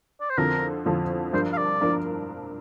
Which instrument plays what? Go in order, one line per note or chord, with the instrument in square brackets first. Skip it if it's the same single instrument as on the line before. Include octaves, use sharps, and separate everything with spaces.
[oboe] D5
C5
[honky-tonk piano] F2 D3 F3 C4 F4 [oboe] A#4
[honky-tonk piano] F2 D3 F3 C4 F4
[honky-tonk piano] G2 F3 D4 A#4 [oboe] C5
[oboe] F5
D5
[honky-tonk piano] F3 D4 A#4